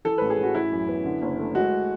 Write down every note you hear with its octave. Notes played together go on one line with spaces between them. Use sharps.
E3 A4
A1 B4
G#4
A1 F#4
E3 E4
F#2
B3
D3
F#1
A3
G#3 F#4